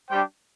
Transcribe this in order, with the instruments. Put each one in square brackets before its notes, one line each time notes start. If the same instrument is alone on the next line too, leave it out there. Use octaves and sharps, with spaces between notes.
[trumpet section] G3 D4 G4 C5 G5